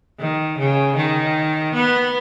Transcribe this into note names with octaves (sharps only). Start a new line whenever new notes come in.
D#3
C#3
D#3
B3